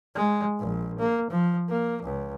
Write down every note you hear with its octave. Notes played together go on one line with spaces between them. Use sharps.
G#3
A#1
A#3
F3
A#3
C#2